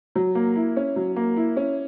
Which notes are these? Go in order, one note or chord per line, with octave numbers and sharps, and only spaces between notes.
F#3
A#3
E4
C#4
F#3
A#3
E4
C#4